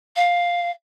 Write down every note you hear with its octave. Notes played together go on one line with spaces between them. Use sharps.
F5